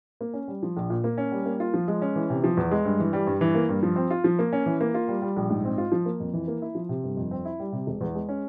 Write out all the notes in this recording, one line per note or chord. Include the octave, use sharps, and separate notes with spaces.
A#3
C#4
G3
F3
A#1
A#2
A#3
C#4
G3
A#3
F4
F3
G#3
C#4
E3
C3
F3
E2
G#3
G2
E3
G3
G2
E3
A#3
G2
F3
C4
F4
F3
A#3
C#4
E3
A#3
F4
G3
G3
A#1
G#2
C4
F4
F3
A#3
F2
E3
A#3
E4
F3
C3
G1
F2
C4
E4
G3
C3
E1
E2
G#3
C#4